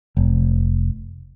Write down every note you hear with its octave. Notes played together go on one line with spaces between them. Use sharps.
F1